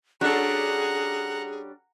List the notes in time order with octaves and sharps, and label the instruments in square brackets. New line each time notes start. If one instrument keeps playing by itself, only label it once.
[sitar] G3 C#4 D4 [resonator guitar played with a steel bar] F#4 A4 [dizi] G#4 [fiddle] F#5 A#5